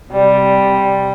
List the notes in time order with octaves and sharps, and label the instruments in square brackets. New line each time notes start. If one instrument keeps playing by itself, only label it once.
[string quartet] C3 G3